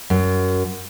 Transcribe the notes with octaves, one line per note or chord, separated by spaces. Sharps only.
F#2